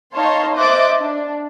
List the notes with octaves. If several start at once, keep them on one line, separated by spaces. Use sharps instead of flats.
D#4 C#5 F5 A5 C6
C5 D#5 E5 D6 F#6 A6
D4